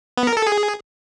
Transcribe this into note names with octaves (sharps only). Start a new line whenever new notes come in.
B3
A#4
A4
G#4